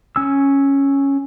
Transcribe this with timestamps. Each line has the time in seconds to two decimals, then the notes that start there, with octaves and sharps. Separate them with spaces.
0.16 C#4 G#5 E6